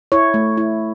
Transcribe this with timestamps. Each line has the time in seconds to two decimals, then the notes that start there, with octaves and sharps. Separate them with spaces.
0.12 E4 C#5
0.34 A3
0.57 E4